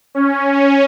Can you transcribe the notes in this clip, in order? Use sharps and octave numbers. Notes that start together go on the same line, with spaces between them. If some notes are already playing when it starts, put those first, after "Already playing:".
C#4
C#4